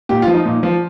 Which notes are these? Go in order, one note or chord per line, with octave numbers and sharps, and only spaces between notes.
A#2 G4
F4
F3
D#4
A#2
F3